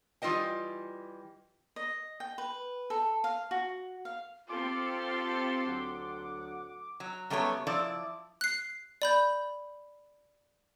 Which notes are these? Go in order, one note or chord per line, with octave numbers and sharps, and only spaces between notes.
E3 G3 F4 C5 D#5 G5
D#5
G5
B4
A4
F5
F#4
F5
C4 F4 G4 A4 C6 D6
D2 F#3 F#5
F#3
F#2 G3 A3 B3 C#5
F3 E4 D5
F#6 C7
D5 B5 G6